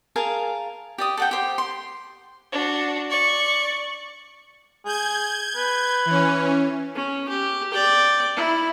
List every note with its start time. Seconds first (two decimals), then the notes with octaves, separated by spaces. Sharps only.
0.16 G#4 A#4 F5 A5
0.98 G4 D5 D#6
1.17 A4 F#5 G5
1.31 G4 C5
1.58 C6
2.52 D4 F#4
3.10 D5 C#6
4.85 G#4 G6 G#6
5.56 B4
6.05 E3 C#4
6.95 C#4
7.29 G4
7.72 D5 G5
8.36 E4